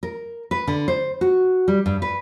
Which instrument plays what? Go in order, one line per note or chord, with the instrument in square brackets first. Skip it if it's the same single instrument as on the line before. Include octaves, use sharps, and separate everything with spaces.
[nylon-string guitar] A#4
B4
D3
C5
F#4
G3
G2
B4